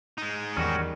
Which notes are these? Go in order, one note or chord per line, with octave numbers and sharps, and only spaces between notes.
G#3 D#4
E2 D#3 G3 C#4 F#4